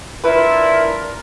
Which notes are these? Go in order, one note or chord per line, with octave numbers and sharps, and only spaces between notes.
D4 E4 F4 A#4 B4